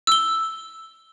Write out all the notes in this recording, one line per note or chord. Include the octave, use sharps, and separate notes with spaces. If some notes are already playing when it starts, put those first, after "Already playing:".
E6 G7